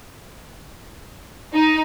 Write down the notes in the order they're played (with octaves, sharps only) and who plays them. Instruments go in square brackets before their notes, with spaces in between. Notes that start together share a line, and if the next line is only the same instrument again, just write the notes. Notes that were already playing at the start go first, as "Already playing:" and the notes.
[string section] D#4